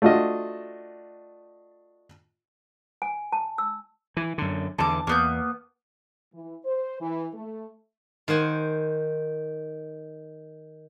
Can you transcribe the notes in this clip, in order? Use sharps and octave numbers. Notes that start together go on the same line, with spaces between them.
A3 D4 F4 F#4 D#5
G#5
A5
E6
E3
F#2 D3
E2 D3 A5 D6
E2 A#3 B3 G6
E3
C5
E3
A3
D#3 C5 F#5 G#5